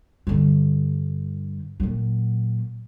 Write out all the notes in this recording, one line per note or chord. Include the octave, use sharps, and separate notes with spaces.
G2 D3
A#2 F#3